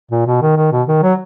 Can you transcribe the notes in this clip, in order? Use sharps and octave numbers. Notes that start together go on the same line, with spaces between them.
A#2
B2
D#3
D#3
B2
D#3
F#3